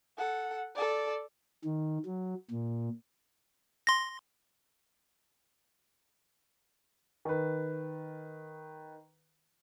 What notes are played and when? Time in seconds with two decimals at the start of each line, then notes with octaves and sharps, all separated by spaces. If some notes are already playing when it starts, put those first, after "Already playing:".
0.18 A4 F#5
0.76 A4 D5
1.65 D#3
2.06 F#3
2.51 A#2
3.87 C6 A#6
7.25 D#3 B4